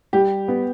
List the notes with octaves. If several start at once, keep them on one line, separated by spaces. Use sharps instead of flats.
G3 G4
B3